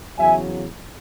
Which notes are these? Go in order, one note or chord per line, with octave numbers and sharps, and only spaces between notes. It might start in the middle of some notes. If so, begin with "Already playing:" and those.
E2 C#3 F#3 E5 G#5